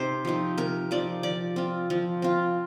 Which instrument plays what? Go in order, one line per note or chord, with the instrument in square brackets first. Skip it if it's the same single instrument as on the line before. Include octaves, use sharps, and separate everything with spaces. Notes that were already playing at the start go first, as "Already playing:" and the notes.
Already playing: [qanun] C3 C4 D#4 C5
F3 C4 D#4
C3 A#4
F3 C4 D#4 D5
F3 D5
C4 F4
F3
C4 F4